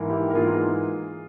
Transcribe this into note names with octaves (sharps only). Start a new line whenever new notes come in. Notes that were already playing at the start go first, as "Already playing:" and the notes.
Already playing: G#2 E3 A#3
E4 G4
A#4
G#2 E3 A#3 F4 G#4